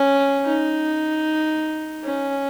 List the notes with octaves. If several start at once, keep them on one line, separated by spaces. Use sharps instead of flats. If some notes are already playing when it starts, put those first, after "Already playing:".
Already playing: C#4
D#4
C#4